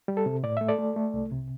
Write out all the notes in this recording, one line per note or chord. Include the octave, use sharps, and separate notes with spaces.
G3
A4
C3
A2 D5
A3 E5
A4 D5
A3
A3
C2
C3